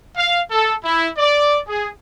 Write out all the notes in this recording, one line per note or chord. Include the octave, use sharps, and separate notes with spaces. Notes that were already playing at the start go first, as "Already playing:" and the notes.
F5
A4
E4
D5
G#4